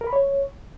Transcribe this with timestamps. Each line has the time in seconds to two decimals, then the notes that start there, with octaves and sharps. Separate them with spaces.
0.01 A#4
0.07 B5
0.13 C#5